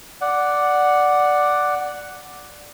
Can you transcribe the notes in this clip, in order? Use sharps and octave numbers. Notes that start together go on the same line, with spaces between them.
D5 F#5